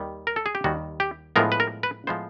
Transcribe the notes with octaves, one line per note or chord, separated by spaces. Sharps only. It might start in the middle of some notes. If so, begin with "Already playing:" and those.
Already playing: D#2 D#3 G3
A#4
A4
G#4
G4
D#2 D#3 G3 F#4
G4
A2 F3 G#3 B3 A#4
B4
A#4
B4
A2 F3 G#3 B3 C5